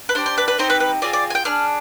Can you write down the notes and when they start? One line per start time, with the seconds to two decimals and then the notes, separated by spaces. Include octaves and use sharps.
0.09 B4
0.15 D4 G4 C5
0.26 C5
0.38 B4
0.48 B4
0.58 C4 D#4 G4 C5
0.70 B4
0.80 B4
1.02 C4 F4 G#4 D5
1.13 D5
1.30 G#5
1.35 G5
1.45 D4 G#4 F6